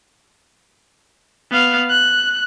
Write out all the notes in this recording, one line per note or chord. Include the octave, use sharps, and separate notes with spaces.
B3 F5
F#6